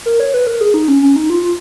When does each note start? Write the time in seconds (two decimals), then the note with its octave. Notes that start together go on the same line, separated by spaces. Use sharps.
0.06 A#4
0.20 C#5
0.34 B4
0.47 A#4
0.61 G#4
0.74 D#4
0.88 C#4
1.02 C#4
1.16 D#4
1.30 F4
1.43 F4